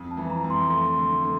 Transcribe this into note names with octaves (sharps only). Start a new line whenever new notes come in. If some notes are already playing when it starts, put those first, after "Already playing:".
Already playing: F2
A5
E3
A#5
F2
C6
A3 C6
D3
D3